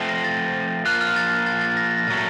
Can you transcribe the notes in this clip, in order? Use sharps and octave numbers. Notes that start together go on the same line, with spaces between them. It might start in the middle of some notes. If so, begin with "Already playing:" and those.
Already playing: F3 A3 C4 F4
A#6
A6
F3 A#3 F4 F#6
F6
A6
A6
A6
A#6
A6
A#6
A#2 F#3 A3 A6